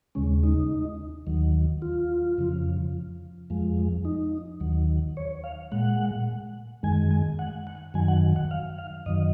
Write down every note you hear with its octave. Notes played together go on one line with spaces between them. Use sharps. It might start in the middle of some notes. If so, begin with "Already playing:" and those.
D#2 C#3 G#3 C#4
D#4
D#2 D#3 F#3
F4
F2 C#3 F3
F2 F3 G#3
D#4
D#2 D#3 F#3
C#5
F5
A#2 G#3 F#5
F#2 D#3 G#3 G#5
G#5
F#5
F#5
F#2 D#3 F#3 G#5
F#5
F#5
F5
F5
F#2 D#3 F#3 D#5